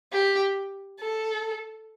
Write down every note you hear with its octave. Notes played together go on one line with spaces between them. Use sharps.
G4
A4